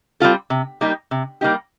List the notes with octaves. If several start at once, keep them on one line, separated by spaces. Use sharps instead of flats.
G3 C4 F4 A4
C3
G3 A#3 D#4 G4
C3
G3 A#3 D#4 G4